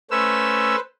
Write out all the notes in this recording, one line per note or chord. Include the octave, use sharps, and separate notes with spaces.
A3 C#4 B4 C5 E6